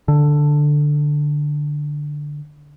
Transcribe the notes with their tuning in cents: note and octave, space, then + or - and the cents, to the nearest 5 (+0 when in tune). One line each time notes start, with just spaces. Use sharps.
D3 +5